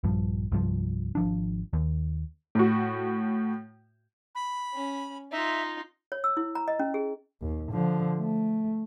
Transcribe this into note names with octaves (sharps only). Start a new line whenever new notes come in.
A#1 G2 F3
C2 G2 F3
G#1 F3 D4
D#2
A2 F#4
B5
C#4
D#4 F4 E5
C#5
E6
E4
A#5
D#5
C#4
G#4
D#2
D3 F3
A3